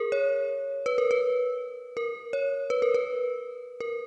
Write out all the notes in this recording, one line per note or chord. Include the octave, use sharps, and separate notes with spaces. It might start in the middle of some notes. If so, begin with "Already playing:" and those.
Already playing: G#4 A#4
C#5
B4
A#4
B4
A#4
C#5
B4
A#4
B4
A#4